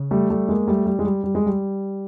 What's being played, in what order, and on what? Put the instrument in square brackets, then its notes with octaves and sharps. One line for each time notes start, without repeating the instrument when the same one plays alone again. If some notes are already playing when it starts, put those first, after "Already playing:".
Already playing: [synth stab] C#3
[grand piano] G3 A3
G3 A3
G#3 A#3
G3 A3
G3
G#3
G3
G3
G#3
G3